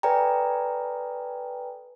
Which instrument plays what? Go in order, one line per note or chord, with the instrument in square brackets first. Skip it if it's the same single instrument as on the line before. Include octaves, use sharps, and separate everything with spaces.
[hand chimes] A4 B4 D5 G5 G#5 A#5